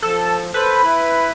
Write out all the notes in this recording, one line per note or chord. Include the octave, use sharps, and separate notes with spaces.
F3 A4
A4 B4 C5
E4 B5